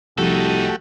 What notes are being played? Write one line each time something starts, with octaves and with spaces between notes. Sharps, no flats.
C2 F3 A3 D#4 F#4 G4 A4